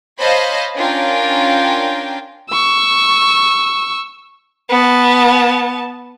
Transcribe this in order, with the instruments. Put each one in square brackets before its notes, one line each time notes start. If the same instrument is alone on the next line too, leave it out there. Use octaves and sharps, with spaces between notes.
[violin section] C5 C#5 D#5 F5 A5 B5
C#4 D4 F4 A#4 G5
[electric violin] C#6 E6
[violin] B3 A5